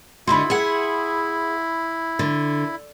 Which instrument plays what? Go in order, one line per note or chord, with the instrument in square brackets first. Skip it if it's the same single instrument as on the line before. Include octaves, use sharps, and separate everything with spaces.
[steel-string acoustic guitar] D3 D#4 F#4 [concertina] E4 [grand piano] B5 C6
[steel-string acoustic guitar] G#4 E5 F#5
D3